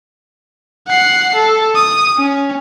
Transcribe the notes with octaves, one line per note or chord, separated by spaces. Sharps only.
F#5 C7
A4
D#6
C#4